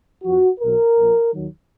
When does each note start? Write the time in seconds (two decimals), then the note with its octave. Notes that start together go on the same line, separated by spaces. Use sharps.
0.23 F2 F3 F#4
0.60 B1 B2 F#3 A#4
0.96 A#1 A#2 F3
1.32 D#2 D#3 F#3